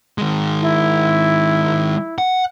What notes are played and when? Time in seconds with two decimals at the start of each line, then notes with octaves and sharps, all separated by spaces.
0.18 D#3 G#3
0.61 E4
2.18 F#5